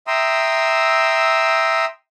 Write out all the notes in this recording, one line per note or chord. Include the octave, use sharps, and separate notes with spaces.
E5 G5 A#5 C6 D#6 E6